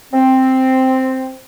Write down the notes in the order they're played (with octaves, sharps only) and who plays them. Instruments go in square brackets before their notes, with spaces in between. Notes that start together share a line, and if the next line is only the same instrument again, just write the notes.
[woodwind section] C4